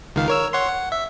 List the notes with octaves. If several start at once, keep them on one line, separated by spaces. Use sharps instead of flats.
C#2 D#3 F5
A#4 C#5 E6
C#5 F#5 C6
F#5
E5